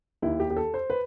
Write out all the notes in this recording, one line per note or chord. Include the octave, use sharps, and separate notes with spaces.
D#2 D#3 E4
G4
G4
A4
C5
B4